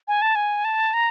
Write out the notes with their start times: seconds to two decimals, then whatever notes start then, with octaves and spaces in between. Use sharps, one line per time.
0.08 G#5
0.22 A5
0.35 G#5
0.65 A5
0.94 A#5